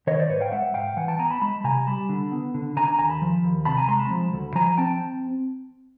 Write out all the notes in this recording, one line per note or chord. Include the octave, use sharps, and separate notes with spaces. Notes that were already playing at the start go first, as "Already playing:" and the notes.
D#3 C#5 D#5
C5 D5
G#2 B4 C#5
F5 G5
G#3 E5 F#5
G#2 F5 G5
E3 F#5 G#5
G5 A5
B3 G#5 A#5
A5 B5
G#3 A5 B5
C3 G#5 A#5
G3 A5 B5
D3
B3
D3
D3 G#5 A#5
G#5 A#5
D#2 G#5 A#5
A5 B5
F3
D#2
C3 A5 B5
G#5 A#5
G#3 A#5 C6
A5 B5
F3
D2
F3 G#5 A#5
C4 G5 A5